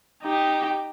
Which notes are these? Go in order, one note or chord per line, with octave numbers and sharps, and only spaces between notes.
D#4 G4